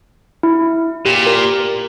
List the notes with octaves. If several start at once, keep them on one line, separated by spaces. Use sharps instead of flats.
E4
A#2 G4
A#4